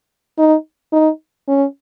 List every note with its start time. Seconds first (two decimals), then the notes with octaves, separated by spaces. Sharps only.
0.39 D#4
0.93 D#4
1.48 C#4